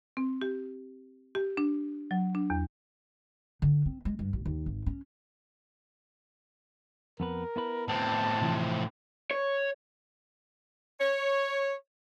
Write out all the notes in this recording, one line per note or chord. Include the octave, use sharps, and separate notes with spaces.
C4
G4
G4
D4
F#3
D4
E2
D3
C4
G#3
G2
A1
D#2
G#1
C#4
F2 B3 A#4 B4
B3 E4 B4
A2 C4 A5
C3 E3 F3
C#5
C#5